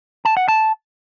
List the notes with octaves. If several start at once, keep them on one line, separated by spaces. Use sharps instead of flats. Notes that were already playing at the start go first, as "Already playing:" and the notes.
A5
F#5
A5